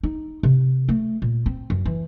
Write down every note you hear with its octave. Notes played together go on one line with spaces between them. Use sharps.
D#4
C3
A3
A#2
C4
F#2
E3